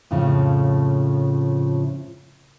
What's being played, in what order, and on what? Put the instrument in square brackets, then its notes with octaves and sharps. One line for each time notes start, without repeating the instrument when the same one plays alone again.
[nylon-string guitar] F2 A2 C#3 F3